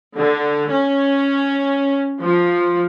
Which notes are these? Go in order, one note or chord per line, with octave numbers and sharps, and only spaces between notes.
D3
C#4
F3